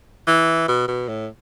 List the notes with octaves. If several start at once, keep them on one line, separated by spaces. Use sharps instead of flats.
E3
B2
B2
A2